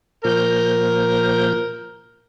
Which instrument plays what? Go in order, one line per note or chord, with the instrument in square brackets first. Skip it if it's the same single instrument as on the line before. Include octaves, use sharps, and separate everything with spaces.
[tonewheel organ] A#2 F3 G6 [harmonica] A#4